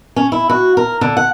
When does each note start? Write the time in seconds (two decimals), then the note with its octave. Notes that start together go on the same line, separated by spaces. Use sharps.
0.16 C#4
0.32 E4
0.50 F#4
0.77 A#4
1.01 D3
1.17 F#5